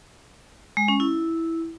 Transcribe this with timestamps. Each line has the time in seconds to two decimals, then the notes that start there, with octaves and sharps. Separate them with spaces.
0.77 G#3
0.88 C#4
1.00 E4